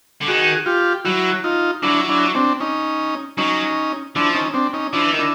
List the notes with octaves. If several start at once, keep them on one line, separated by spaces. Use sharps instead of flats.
D3
D#3 F#4 G#4
F4 G4
F#3 E4 F#4
D#4 F4
F#3 D4 E4
D4 E4
C4 D4
C#4 D#4
F#3 C#4 D#4
F3 D4 E4
C#4 D#4
C4 D4
C#4 D#4
F3 D4 E4
E3
D#3
D4 E4